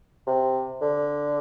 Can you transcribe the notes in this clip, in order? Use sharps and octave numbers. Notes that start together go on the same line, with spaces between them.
C3
D3